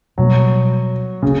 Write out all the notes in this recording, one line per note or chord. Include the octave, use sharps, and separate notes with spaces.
B2 F#3 G3 A#3
C#3 A#3 C#4